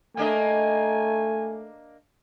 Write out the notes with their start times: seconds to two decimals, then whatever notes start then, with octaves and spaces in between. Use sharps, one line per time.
0.17 A3 A#3 D4 D#5 G#5